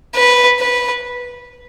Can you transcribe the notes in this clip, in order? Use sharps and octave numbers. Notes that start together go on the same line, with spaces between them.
B4
B4